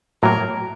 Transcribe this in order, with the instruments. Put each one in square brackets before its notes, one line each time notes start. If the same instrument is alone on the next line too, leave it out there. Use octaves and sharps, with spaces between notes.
[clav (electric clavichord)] A2 F#3 A#3 [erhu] A#4